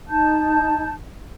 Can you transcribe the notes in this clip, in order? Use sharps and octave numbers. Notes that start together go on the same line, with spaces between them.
D#4 A5 G6